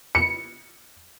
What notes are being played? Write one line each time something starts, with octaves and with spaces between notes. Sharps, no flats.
C#7